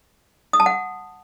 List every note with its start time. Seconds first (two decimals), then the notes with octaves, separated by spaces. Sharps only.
0.53 D#6
0.60 A5
0.66 F#5